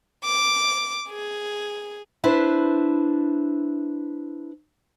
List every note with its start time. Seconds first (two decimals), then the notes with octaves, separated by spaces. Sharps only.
0.24 D6
1.09 G#4
2.24 D4 E4 B4 C5